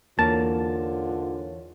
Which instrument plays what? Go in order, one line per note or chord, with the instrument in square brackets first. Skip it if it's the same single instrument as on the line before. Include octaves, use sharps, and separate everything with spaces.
[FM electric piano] E2 E3 C#5 [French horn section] G#2 D3 F4 [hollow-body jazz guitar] A#3 [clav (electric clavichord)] A5